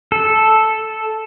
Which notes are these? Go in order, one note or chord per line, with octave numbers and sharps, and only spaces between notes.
A4